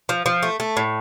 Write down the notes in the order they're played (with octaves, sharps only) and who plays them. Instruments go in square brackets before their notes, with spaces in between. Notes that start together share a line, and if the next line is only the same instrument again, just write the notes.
[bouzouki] F3
F3
A3
A3
A2